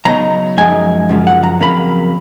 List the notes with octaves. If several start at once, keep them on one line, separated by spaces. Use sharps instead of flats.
C#3 F#3 B3 D#4 A#5
F#2 F3 G#3 D#4 G#5
F#2 C#3 F3
F#5
A#5
F2 C#3 F#3 A#3 B5